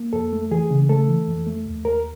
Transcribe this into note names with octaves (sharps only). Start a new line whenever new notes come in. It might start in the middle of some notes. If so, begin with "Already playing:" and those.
Already playing: A#3
F2 A4
A3
E3 G#4
C#3
A3 A4
E3
F2
A3
D#2
D#2 A#4